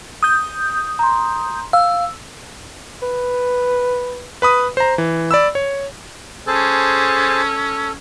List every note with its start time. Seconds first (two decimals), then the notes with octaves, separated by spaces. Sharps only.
0.23 D#6 G6
0.99 A#5 C6
1.73 F5 E6
3.02 B4
4.42 B4 B5 D#6
4.77 C5 A#5
4.98 E3
5.31 D5 B5 E6
5.55 C#5
6.47 C#4 G#4 A4 C5 A5